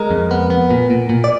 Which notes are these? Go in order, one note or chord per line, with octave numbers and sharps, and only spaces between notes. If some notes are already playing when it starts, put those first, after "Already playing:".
Already playing: G#3 A#4
F2
B3
B3
A#2
A#2
A#2
D5